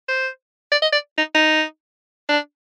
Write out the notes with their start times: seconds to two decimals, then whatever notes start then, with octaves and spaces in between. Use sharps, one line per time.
0.08 C5
0.72 D5
0.82 D#5
0.93 D5
1.18 D#4
1.35 D#4
2.29 D4